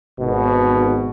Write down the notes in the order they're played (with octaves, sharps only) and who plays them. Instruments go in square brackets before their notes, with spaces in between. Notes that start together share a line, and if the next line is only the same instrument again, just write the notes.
[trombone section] G#1 B2